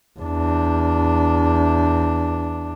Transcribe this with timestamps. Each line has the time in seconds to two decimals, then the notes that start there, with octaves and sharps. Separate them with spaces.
0.20 E2 D4